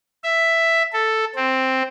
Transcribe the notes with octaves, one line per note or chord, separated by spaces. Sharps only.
E5
A4
C4